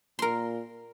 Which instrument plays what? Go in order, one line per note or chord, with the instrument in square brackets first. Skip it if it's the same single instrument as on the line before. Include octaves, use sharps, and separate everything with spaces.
[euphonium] A#2 [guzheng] A#4 C6